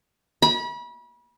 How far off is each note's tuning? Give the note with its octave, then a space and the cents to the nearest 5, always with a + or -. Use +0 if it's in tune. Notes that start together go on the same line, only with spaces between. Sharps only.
B5 -35